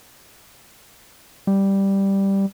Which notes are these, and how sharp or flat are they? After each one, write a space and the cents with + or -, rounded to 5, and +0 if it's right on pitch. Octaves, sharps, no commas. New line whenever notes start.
G3 +0